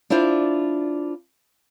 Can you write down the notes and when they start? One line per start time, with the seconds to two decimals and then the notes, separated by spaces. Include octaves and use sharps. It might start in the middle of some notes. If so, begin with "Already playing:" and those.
0.10 D4 E4 F4 C5 D5